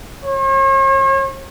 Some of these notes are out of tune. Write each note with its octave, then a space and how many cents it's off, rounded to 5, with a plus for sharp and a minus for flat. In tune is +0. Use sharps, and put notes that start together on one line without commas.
C#5 -45